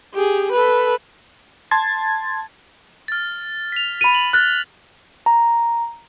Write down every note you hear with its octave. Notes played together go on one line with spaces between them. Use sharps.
G4 G#4
A4 B4
A5 C6 G#6 A6
F6 A6
B6 F7
B5 D#7
F#7
F6 F#6 A6
A#5